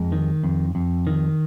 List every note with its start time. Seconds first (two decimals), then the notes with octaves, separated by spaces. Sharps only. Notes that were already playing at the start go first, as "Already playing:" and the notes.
Already playing: F2 G#3
0.12 D#3
0.43 F2
0.75 F2
1.07 D#3